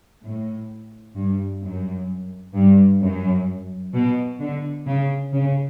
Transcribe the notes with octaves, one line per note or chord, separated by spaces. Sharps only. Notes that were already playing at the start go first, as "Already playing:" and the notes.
A2
G2
F#2
G2
F#2
B2
D3
C#3
C#3